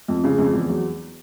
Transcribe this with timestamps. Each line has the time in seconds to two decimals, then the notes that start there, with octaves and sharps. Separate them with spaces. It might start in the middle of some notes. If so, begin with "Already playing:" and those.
0.08 F2
0.24 C#3
0.39 F2
0.54 E2
0.69 F#3